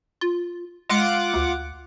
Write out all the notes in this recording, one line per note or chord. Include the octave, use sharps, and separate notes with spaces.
F4
G#3 F4 F#5 D6
D2